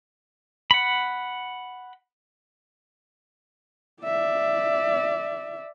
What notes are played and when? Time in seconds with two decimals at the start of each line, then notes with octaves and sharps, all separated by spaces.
0.71 F#5 B5
4.03 D5 E5